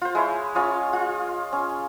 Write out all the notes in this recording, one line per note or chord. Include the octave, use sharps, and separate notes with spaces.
F4 C5
G#3 E4 C#5
C#4 F4 C#5 D#5
F4
C#4